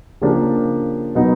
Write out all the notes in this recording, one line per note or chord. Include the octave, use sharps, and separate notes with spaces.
C#3 F3 A#3 D4 G4
B2 F#3 B3 D#4